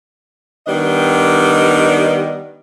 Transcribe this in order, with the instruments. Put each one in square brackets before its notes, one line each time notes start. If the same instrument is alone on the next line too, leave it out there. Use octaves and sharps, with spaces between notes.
[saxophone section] D#3 G3 B3 D4 D#5